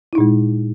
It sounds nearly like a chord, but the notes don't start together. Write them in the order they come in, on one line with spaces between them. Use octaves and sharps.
E4 D#4 A#2 G#3